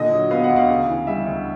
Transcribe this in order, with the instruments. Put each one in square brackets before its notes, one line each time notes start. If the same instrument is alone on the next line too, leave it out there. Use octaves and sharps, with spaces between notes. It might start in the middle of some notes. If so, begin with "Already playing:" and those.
Already playing: [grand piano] A#2 D3 D#5
F#3
B3 F5
F#5
D2
F5
C#3
E3
G3 E5
D2